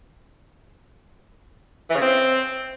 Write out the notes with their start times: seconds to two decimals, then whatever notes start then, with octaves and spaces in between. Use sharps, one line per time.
1.90 E3
1.95 C#3
2.00 C4